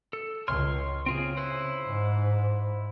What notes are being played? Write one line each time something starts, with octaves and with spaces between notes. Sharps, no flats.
A4
C#2 C#5 C6 F6
C#3 C4 F4 G#4
E4 B4 C5
G#2